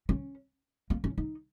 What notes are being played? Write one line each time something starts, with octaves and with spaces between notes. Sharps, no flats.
C#4
A#3
C#4
D#4